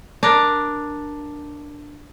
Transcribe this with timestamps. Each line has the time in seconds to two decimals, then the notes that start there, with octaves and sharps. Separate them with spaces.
0.23 D4 A#4